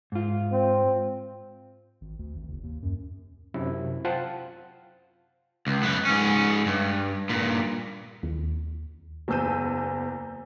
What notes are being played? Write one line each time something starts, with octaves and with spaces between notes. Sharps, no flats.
G#2 F4
C4
G#1
D2
G#1
F#1
D#2
F#2
F#2 C3 E4
F4 C5 F#5 G5 A5
C#2
F#2 B3
G#2 C#4
G2
G2 A#2
D#2
F#1 E2 A5 E6 G6 D#7